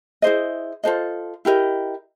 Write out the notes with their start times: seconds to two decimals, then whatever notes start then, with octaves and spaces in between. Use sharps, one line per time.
0.22 E4 G#4 C5 D#5
0.84 F4 A4 C5 D#5
1.45 E4 G4 A#4 D#5